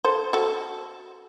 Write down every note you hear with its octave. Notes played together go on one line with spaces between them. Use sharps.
A4 C5
F#4 A4